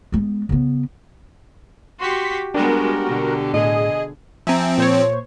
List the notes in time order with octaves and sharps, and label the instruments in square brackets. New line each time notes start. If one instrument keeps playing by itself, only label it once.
[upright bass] G#3 B3
C#3 B3
[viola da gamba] F#4 G4 [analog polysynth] C6 C#6 B6
[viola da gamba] G3 G#3 B3 [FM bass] D4 [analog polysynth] F#4 A#4 [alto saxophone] G4
[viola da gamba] B2 D3
[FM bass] A2 [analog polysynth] G#4 [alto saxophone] D#5
[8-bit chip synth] F3 C4 [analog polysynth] E5 G#5 A#5
[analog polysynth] A#2 C5 C#5